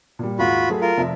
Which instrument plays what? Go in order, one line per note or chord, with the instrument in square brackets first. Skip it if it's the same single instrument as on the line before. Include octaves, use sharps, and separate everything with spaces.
[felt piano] A#2 G3
[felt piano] D#2 G#2 [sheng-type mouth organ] F4 F#4 B5
[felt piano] F#3 A3 G#4
[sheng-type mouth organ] F4 A#4
[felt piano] F1 F3 E5